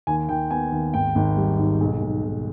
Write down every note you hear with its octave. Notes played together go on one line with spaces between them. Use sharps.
D#2 G#5
D#2 G5
B3 G#5
D#2
G#1 G5
G#1
G3
G#2
B1
B1
B1